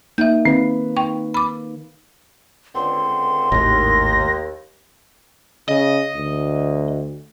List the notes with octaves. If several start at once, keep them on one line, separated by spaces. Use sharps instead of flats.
A#3 D#4 E5 G6
D#3 C4 B4
G5 C#6
B5 D6
C#2 D3 C4 C6
G#1 D#2 A2 A#6
C#3 D#5
D2